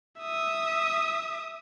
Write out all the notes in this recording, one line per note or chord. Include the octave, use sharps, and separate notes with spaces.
E5 D#6